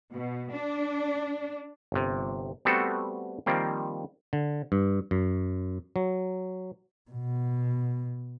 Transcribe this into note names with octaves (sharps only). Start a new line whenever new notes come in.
B2
D4
G1 C3
G3 A3 B3 C4 F#4 A4
D#3 F3 G3 A#3 C4
D3
G2
F#2
F#3
B2